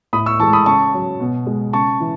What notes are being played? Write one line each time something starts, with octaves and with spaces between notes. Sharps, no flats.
A2 B5 D#6
C#6 E6
E3 G#3 A5 C#6
B5 D#6
C#3 A5 C#6
F#3
B2
G#3
C#3 A5 C#6
E3